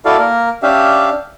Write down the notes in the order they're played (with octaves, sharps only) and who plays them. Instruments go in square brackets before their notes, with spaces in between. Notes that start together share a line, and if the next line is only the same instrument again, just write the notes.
[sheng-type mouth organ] E4 F#4 A4 D5 F5
A#3 A#4
C#4 D4 G4 E5 F5